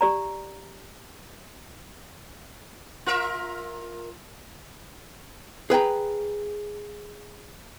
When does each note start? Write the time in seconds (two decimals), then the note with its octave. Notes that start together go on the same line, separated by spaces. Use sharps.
0.01 G4 D5 A#5
3.06 F4 A#4 E5
5.70 G#4 B4 G5 A#5